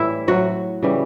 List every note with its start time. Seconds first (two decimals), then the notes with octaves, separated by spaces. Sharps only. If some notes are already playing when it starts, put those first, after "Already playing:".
Already playing: A2 E3 G3 E4
0.28 A2 F#3 F#4
0.83 C#3 E3 G3